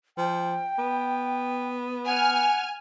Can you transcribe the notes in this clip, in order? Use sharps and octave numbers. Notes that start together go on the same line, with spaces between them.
F3 G5
B3
F#5 G#5 F6